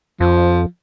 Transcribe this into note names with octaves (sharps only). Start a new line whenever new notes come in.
F2 F3